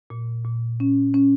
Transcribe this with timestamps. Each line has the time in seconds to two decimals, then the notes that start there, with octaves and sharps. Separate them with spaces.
0.10 A#2
0.45 A#2
0.80 C#4
1.14 C#4